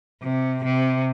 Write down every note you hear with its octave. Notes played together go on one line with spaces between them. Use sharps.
C3
C3